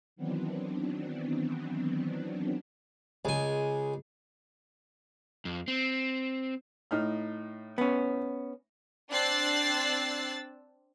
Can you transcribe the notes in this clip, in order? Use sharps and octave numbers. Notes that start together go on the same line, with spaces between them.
D#3 E3 F#3 B3 C4 D4
C#2 G#3 G#4 G#5
F2
C4
A2 D#4 F6
B3 C#4
C4 D4 E6 F#6 A6 C7